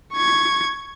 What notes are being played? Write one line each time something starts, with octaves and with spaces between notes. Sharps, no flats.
C#6 G#6